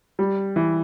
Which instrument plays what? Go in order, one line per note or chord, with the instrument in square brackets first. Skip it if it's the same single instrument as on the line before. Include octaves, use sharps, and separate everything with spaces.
[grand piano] G3
E3